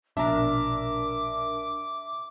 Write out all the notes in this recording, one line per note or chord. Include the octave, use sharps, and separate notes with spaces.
A#1 B2 D4 A#4 E5 A#5 D6